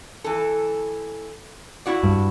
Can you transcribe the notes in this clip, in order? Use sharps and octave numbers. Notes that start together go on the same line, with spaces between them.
E3 A4
E4 F#4 D5
G2